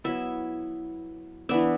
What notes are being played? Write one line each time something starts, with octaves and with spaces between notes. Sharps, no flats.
F#3 B3 E4 E5
E3 B3 D4 E5